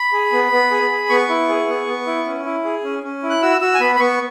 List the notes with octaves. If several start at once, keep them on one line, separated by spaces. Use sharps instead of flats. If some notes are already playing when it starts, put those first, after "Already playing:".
Already playing: B5
G#4
B3
B3
G#4
G#4
B3 C#6
E4
G#4
B3
B3
E4
C#4
E4
G#4
C#4
C#4
E4
F#6
F#4 E6
F#4 E6
G#5
B3 B5
B5
B3 C#6